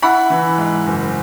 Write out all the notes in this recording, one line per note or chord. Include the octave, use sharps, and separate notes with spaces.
E4 F#5 B5
E3
G#2
F#1